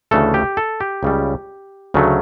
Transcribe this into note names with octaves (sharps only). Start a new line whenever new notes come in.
D2 C#3 E3 A3 A4
G4
A4
G4
C#2 C#3 G3
D2 C#3 F#3 A3